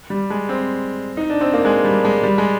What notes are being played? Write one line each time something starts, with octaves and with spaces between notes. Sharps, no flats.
G3
G#3
C4
D#4
D4
C4
A#3
G#3
G3
G#3
G3
G#3